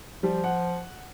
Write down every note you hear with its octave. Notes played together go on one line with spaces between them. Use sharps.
F3 G3
F#5